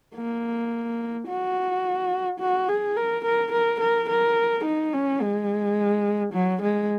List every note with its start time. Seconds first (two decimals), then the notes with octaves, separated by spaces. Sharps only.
0.15 A#3
1.28 F#4
2.40 F#4
2.69 G#4
2.96 A#4
3.25 A#4
3.53 A#4
3.81 A#4
4.10 A#4
4.65 D#4
4.93 C#4
5.22 G#3
6.33 F#3
6.62 G#3